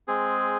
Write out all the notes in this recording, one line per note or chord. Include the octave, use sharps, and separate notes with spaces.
G#3 C4 G#4